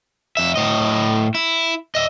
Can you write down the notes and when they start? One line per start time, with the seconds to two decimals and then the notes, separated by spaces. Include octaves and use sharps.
0.37 F2 E5
0.56 A2 D#5
1.35 E4
1.95 D#5 E5